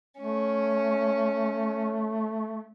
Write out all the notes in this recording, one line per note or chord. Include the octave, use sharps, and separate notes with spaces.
A3 C#4